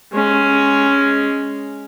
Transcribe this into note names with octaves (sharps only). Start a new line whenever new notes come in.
G#3 C#4